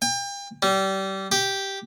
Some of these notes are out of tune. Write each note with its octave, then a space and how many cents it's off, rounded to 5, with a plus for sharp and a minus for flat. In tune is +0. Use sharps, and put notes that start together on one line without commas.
G5 +35
G3 -25
G4 -5